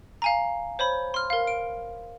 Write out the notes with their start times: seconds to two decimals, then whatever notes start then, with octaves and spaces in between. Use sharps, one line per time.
0.22 F5 G#5 A#5
0.79 C5 C#5 B5
1.14 C6 F6
1.30 A#4 F5
1.47 D7